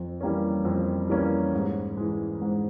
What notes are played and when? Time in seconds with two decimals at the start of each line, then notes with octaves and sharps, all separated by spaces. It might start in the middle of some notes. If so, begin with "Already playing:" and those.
Already playing: F2
0.20 E3 G3 A#3 C#4
0.65 F2
1.10 E3 G3 A#3 C#4
1.53 G#2
1.97 E3 G#3
2.41 G#2